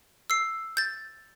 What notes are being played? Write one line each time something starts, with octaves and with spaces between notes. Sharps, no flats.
E6 C7
G6 A6